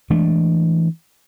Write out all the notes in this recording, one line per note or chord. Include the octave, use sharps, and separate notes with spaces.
E3 G#3 A3 D4